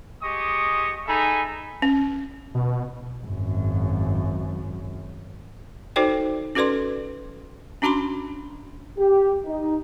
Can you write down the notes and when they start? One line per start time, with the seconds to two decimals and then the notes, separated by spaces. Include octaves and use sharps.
0.22 G#3 G4 D#5 C#6 D#6
1.07 D#4 G#4 A4 E5 G#5 B5
1.82 C#4
2.55 B2
3.26 G#1 F#2
5.96 D#4 F#4 A4 C5 D5 G5
6.55 C#4 F#4 A4 B4 D5 C6
7.82 C#4 D4 F#4 A5 B5 C6
8.98 G4
9.46 D#4